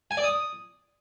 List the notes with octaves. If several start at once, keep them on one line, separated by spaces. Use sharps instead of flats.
G#5
D5
D#6